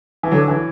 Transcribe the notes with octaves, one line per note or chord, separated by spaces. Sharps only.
E3
D3 F#3
E3